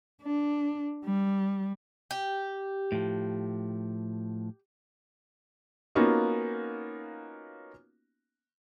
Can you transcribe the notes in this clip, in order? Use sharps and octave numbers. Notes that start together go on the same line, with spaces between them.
D4
G3
G4
A2 F3
A#3 B3 C#4 D#4 F4 F#4